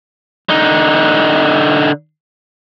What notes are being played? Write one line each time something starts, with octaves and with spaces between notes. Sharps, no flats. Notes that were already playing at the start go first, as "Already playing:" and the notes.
D3 D#4